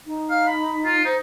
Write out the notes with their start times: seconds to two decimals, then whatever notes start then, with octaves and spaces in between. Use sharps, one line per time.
0.06 D#4
0.30 F5
0.47 B5
0.85 F4
1.05 D#4 C5